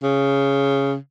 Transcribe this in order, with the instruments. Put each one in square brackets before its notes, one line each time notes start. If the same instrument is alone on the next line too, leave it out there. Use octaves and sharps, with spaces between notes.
[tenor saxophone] C#3